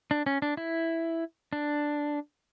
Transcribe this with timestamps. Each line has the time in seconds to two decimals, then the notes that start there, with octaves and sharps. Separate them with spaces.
0.11 D4
0.26 C#4
0.42 D4
0.57 E4
1.53 D4